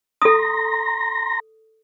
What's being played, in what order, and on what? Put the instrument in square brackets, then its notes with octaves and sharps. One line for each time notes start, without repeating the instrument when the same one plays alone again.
[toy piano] A4 D#6 [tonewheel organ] A#5 C6 A#6